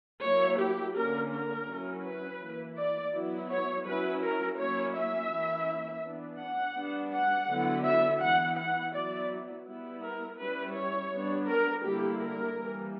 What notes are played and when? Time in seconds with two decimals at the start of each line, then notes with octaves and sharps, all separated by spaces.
0.22 F#3 A#3 E4 C#5
0.59 G4
0.95 D3 A#3 C#4 A#4
1.32 A#4
1.68 F#3 C#4 E4
2.04 B4
2.41 E3 A#3 E4
2.76 D5
3.13 F#3 B3 E4
3.50 C#5
3.85 F#3 C#4 E4 B4
4.22 A#4
4.58 F#3 A#3 C#4 E4 C#5
4.95 E5
5.31 E3 A#3 C#4 E4
6.04 E3 B3 D4
6.39 F#5
6.76 G3 B3 D4
7.12 F#5
7.49 D3 F#3 B3 E4
7.85 E5
8.21 E3 B3 E4 F#5
8.58 F#5
8.94 F#3 B3 E4 D5
9.66 G3 B3 E4
10.03 A#4
10.39 G3 C#4 E4 B4
10.75 C#5
11.11 G3 B3 D4
11.48 A#4
11.84 D3 G3 A#3 E4 G4
12.20 A#4
12.56 E3 G3 A#3